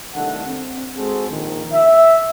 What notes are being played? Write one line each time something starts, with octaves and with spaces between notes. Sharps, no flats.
C2 D#3 A3 D4 A4 F#5
C4
G#3 C4 F#4 G#4 A4 C5
A#1 D#3
E5